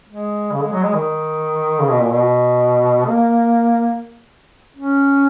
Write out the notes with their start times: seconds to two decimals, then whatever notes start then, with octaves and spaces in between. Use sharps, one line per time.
0.09 G#3
0.52 C#3
0.62 G#3
0.72 F#3
0.83 G#3
0.94 D#3
1.80 C#3
1.90 B2
2.01 A#2
2.11 B2
3.07 A#3
4.76 C#4